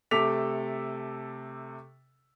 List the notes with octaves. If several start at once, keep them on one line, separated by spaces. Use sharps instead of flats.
C3 A3 A4 D6 B6 F7